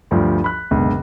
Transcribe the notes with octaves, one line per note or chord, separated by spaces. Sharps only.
D2 G2 F3
B5 F#6
F#1 C#2 B2 D3